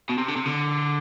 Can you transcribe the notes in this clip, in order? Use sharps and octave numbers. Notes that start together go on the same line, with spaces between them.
B2
C3
D3
C3
D3